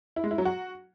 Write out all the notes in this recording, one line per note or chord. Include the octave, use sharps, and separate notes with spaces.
E4
G#3
E4
F#3
F#4